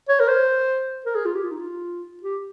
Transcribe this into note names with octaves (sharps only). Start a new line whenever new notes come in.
C#5
A#4
C5
A#4
G#4
F4
G4
F4
D#4
F4
G4